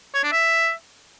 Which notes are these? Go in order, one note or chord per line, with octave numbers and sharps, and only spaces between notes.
C#5
D4
E5